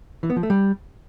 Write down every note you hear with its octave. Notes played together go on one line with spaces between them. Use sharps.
E3
B3
F3
A3
G3